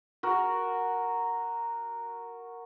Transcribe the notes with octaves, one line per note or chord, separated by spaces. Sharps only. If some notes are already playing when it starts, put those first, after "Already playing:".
F#4 A#4